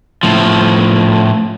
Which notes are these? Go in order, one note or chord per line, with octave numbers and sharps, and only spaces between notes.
A2 F3